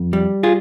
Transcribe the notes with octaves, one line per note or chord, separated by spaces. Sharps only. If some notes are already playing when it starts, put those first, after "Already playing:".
Already playing: F2
G3
F4 G#4